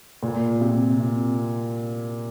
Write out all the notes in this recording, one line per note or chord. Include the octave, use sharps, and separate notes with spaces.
A#2
C3
C3